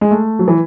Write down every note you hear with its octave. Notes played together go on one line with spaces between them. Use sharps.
G#3
A3
F#3
E3